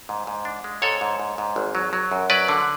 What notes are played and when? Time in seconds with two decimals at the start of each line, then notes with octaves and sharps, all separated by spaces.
0.09 G#2
0.27 G#2
0.45 D4
0.64 G#3
0.82 G#2 A4 C#5
1.01 G#2
1.20 G#2
1.38 G#2
1.56 G#1
1.75 F#3
1.93 F#3
2.12 F#2
2.30 F#3 B4 D5
2.48 D3